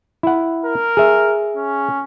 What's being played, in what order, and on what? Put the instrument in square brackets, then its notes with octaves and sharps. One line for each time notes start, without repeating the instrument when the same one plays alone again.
[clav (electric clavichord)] E4 F#5
[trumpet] A#4
[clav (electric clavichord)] G#4 E5
[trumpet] C#4